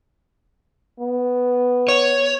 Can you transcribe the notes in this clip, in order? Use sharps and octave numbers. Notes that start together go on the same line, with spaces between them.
B3
C#5